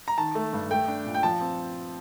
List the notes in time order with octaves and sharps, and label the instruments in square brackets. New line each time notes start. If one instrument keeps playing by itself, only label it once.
[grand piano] A#5
D#3 A5
A3
G2
A3 G5
D4
A#2
G5
F3 A5
C4